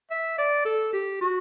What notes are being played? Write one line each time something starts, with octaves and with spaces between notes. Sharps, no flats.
E5
D5
A4
G4
F#4